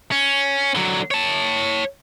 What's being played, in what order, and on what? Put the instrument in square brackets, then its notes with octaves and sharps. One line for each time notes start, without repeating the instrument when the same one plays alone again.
[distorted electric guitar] C#4
D3 F#3
C#5 A5